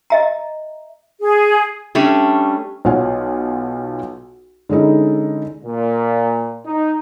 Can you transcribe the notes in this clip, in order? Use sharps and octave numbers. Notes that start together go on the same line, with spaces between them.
D#5 E5 A#5
G#4
G3 A3 C#4 D4
B1 F4 C#5 F#5 G#5
D3 G#3 C#4 D#4 E4
A#2
D#4